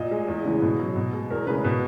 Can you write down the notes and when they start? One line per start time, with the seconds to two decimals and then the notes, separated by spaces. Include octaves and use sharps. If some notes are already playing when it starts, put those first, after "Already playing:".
Already playing: A#2 D#5
0.11 G#3
0.28 E2
0.45 C#3 E3 G#3
0.62 B2
0.79 F#3
0.96 B2
1.13 G#3
1.30 E2 A#4
1.47 C#3 G#3 B4
1.64 B2 B4